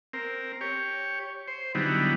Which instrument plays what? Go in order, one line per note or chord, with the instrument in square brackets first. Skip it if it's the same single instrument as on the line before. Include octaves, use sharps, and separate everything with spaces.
[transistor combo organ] C4 A#4
G4 C#5
C5
D3 F#3 G3 B3 D#4 E4